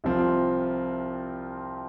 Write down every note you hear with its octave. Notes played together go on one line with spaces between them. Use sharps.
C2 C3 F3 C4 F4